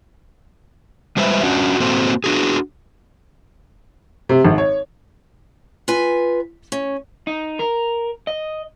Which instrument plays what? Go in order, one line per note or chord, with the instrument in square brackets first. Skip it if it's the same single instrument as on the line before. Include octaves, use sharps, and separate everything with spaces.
[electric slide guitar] G3 G#3 B4 C5 E5
C#4 D4 F#4
A#3 C4 F#4 A4 C5
D4 F#4 G#4
[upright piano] C3
G#1
C#5
[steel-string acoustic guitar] F4 B4 G#5
C#4
[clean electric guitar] D#4
A#4
D#5